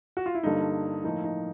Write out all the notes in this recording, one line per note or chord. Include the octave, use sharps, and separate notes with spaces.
F#4
F4
E4
G2 D3 G3 A#3 D#4
A2 F3 A#3 D#4
D#4